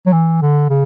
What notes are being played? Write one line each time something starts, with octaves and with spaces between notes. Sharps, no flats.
F#3
E3
D3
C#3